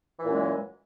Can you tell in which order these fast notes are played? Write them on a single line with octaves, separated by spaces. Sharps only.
E3 A#2 F#2 G#3